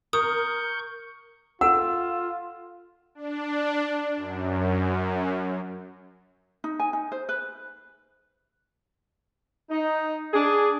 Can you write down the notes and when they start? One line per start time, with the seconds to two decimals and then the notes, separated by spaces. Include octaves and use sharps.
0.13 A#4 C#6 D#6 G6
1.61 F4 A4 F#5 E6
3.15 D4
4.16 F#2
6.64 D#4
6.80 G#5
6.93 D#4
7.12 C5
7.29 B4
9.70 D#4
10.34 D4 G#4